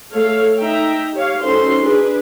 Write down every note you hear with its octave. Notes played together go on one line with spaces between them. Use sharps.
A3 A4 C#5 F5
D#4 E5 G5 A#5
G4 C#5 F5
C#4 D#4 F#4 A4 C5 C6
D4 G#4 B4